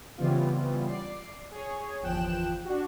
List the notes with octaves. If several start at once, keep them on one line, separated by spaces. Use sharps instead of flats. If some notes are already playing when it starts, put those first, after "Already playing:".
C#3 E3 G3 B3 C4 F4
D5 C7
G#4 C#5
G1 E2 F3 G5 F#6 E7
D4 F#4